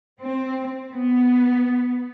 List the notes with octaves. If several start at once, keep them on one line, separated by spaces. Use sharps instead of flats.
C4
B3